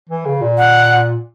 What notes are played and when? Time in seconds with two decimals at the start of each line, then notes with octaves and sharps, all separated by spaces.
0.09 E3
0.25 C#3
0.42 A#2
0.58 F#5